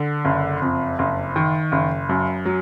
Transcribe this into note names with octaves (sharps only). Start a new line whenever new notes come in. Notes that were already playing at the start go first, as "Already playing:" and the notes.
Already playing: D3
F#1
F2
F#1
D#3
F#1
F#2
F#3